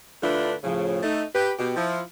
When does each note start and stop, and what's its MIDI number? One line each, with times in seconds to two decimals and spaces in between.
0.23 0.53 50
0.23 0.53 57
0.23 0.53 62
0.23 0.53 64
0.23 0.53 65
0.23 0.53 71
0.64 0.98 45
0.64 0.98 49
0.64 0.98 53
1.03 1.23 57
1.03 1.23 63
1.34 1.52 67
1.34 1.52 71
1.59 1.75 47
1.59 1.75 67
1.76 2.01 53
1.76 2.01 64